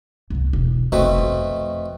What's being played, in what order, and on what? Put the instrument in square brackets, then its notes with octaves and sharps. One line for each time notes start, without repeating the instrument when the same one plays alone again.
[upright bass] C2 B3
E1
[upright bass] F1 [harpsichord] B2 A3 C4
[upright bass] F2